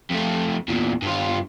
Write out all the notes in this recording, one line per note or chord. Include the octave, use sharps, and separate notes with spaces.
F2 A3
E2 A#2
G2 F4